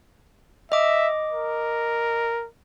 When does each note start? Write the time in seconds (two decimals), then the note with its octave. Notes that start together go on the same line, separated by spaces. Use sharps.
0.72 D#5 E5 D6
1.31 A#4